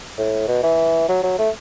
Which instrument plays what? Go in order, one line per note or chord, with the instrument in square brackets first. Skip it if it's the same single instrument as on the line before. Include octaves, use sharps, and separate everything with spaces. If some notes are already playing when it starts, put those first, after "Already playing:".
[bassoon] A2
B2
E3
F#3
F#3
A3